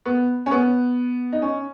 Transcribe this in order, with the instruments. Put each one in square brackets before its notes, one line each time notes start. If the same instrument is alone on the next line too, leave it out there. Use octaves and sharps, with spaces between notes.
[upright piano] B3
C#4
B3
D#4
C#4